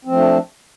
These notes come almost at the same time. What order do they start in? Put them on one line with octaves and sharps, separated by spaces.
C4 F3 A3 D4